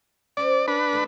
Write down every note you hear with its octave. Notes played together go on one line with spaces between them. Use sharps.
C#4 C5 D5
D4 B4
E3 A3